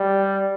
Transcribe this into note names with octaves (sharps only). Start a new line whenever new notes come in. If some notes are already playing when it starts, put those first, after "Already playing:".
Already playing: G3